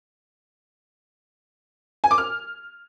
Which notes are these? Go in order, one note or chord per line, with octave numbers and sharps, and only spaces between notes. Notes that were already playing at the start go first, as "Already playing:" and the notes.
G#5
D6
F6